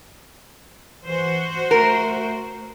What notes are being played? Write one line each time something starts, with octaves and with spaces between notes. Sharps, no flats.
E3 F#4 C5
A3 A#4